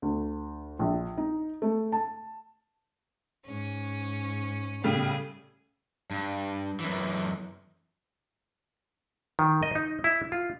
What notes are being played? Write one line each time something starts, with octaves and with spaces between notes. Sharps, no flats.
D2
A#1
D#4
A3
A5
G#2 C#4
A2 C#3 G3 G#4
G2
F#2 E3
D#3
D#5
D#4
E4
F4